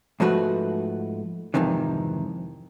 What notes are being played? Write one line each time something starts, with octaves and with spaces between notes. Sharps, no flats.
G#2 F3 A3 F#4 B4
F2 G#2 C3 D#3 E3